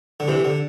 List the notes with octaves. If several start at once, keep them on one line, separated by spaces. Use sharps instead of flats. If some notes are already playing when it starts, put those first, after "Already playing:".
D3
C3 E3
D3